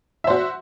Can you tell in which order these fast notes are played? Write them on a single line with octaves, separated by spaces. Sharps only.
E5 C5 F#4